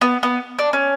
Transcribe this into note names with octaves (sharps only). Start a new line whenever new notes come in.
B3
B3
D4
C#4